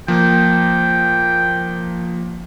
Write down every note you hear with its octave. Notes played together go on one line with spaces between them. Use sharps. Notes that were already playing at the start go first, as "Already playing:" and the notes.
F3 A#3 G5